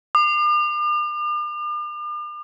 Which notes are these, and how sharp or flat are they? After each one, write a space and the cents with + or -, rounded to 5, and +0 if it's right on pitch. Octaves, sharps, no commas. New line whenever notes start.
D6 +45